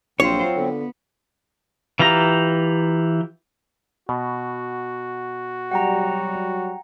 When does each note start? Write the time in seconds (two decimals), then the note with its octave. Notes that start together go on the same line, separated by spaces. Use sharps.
0.20 A#1 F#3 C4 F4 C5 C#5
0.56 D3 B3
1.99 E3 F4 G4 A#5
4.09 B2 F#4
5.71 F#3 G3 F#5 G5 A#5